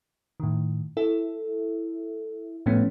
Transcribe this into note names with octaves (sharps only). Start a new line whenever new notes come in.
A2 D#3
E4 A4 E5
A2 F3 A3 B3 C#4